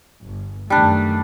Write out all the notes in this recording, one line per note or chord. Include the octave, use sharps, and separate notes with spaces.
G1
F#2 D#3 G3 A3 D4